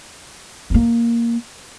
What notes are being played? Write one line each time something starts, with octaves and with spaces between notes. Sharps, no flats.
A3
A#3